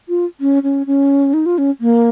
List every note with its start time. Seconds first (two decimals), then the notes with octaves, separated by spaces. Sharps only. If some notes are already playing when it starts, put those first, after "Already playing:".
0.09 F4
0.40 C#4
0.63 C#4
0.87 C#4
1.34 D#4
1.46 F4
1.58 C#4
1.81 A#3